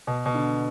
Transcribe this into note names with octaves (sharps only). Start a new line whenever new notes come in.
B2
B2
D3